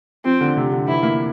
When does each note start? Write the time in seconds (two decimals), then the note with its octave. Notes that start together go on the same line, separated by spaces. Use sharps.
0.25 F3 C4
0.41 D3
0.57 C3
0.72 D3
0.88 E3 E4
1.02 A#3